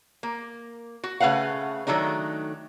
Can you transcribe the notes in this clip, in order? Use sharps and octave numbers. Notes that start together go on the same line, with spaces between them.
A#3
F#4
C#3 A3 B4 F5 F#5
D#3 F#3 A3 D4 D#4